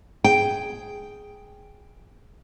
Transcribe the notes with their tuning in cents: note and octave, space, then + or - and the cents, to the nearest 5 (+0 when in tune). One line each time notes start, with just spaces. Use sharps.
G#4 +0 G5 +0